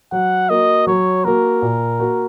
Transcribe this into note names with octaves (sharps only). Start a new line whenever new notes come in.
F#3 F#5
A#3 F#4 D#5
F#3 C#5
A#3 F#4 A#4
A#2
A#3 F#4